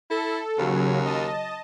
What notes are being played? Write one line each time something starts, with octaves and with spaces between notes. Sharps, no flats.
E4 A4
D#2 C#3 F#3
D#5 A5